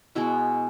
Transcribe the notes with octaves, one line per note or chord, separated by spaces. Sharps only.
B2 G#3 B3 E4 F#4